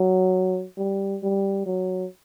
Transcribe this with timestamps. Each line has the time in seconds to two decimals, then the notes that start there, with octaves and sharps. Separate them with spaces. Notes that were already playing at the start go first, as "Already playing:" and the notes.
Already playing: F#3
0.78 G3
1.23 G3
1.66 F#3